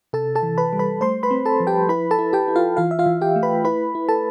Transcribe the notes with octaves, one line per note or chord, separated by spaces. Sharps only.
C3 A4 A5
A4 A5
E3
B4 B5
G3
B4 B5
A3 C5 C6
B4 B5
C4
A4 A5
F3
G4 G5
E4 B4 B5
A4 A5
E4
G4 G5
E4
F4 F5
E3 F4 F5
E5
F4 F5
E3
G4 G5
A3
B4 B5
E4 B4 B5
E4
A4 A5